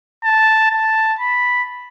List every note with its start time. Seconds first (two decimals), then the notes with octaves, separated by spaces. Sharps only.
0.24 A5
0.71 A5
1.19 B5